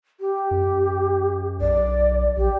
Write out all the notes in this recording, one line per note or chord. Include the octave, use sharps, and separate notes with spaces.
G4
F#2
B1 D5
A#1 G4